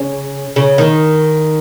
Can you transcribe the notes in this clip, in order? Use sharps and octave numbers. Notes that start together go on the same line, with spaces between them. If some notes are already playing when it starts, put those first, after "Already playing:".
Already playing: C#3
C#3
D#3